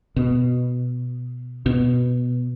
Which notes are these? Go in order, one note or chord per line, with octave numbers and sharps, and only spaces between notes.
B2
B2